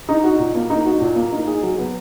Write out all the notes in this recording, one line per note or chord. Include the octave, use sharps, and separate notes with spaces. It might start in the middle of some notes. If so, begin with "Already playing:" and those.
D#4
F#4
A#2
A#3
D#4
F#4
A#2
A#3
D#4
G#4
F#3
B3